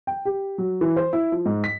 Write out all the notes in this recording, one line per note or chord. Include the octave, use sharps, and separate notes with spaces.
G5
G4
F#3
E3
C5
E4
F3
G#2
B6